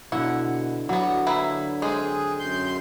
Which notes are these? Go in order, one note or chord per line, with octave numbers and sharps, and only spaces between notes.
B2 D3 E4 F#5
D3 F#3 G3 B3
A#3 E4 B4
G#3 C4 G#4
F#2 C6 G6